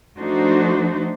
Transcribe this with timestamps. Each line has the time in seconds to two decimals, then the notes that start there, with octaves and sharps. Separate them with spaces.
0.18 F3 A3 D4 D#4 F#4 C5